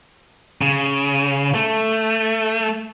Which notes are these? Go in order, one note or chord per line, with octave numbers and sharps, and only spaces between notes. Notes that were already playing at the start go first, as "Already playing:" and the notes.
C#3
A3